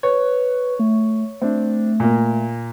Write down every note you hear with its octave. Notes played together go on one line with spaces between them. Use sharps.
B4 C#5
A3
A3 C4 D4
A#2 A#3